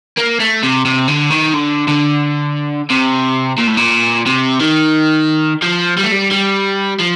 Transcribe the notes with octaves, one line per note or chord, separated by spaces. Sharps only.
A#3
A3
C3
C3
D3
D#3
D3
D3
C3
A#2
A2
A#2
C3
D#3
F3
G3
A3
G3
G3
F3